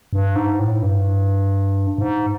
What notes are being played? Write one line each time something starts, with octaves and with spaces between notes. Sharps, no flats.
G2
G#2
A2
G2
G#2